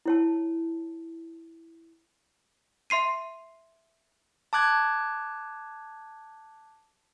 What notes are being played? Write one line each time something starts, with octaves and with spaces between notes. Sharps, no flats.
E4 C#5 A5
E5 C6 C7 D#7
A5 D6 F#6 G#6